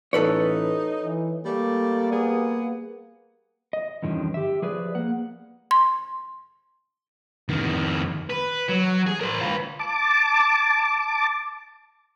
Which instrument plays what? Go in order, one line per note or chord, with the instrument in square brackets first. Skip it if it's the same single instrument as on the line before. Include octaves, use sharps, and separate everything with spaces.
[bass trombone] A1 [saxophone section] D#4 [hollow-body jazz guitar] A4 B4 C#5
[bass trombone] E3
[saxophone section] G3 A3 D5 [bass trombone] A#3
[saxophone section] G3 B3 G#4
[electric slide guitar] D#5
E2 G2 D3 D#3 F3 C#4
G4 E5
F3 G#4 B4 D5
A#3 F#5
[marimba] C6
[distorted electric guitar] F2 D#3
B4
F#3
G#4
A#4 C5
F4 B4
[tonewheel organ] A5 D6